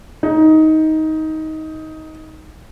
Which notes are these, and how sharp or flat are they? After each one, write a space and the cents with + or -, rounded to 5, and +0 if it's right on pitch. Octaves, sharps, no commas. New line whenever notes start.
D#4 +15